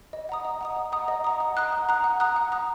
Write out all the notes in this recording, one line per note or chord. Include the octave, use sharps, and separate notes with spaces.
D#5
F#5 A#5 D#6
D#5
F#5 A#5 D#6
D#5
F#5 A#5 D#6
D#5
F#5 A#5 D#6
F#5
A#5 D#6 F#6
F#5
A#5 D#6 F#6
F#5
A#5 D#6 F#6
F#5
A#5 D#6 F#6